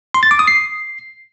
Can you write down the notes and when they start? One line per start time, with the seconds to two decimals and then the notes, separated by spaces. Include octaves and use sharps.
0.14 C6
0.23 A6
0.31 D6
0.39 D#6
0.47 C7